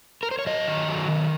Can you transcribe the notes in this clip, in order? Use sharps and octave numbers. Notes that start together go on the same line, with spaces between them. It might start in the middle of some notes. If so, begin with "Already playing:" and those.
A#4
C5
C#5
F#3 D#5
D#3
F#3
D#3